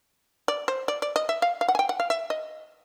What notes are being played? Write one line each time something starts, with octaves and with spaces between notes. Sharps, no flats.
D5
C5
D5
D5
D#5
E5
F5
F5
F#5
G#5
G5
F#5
F5
E5
D#5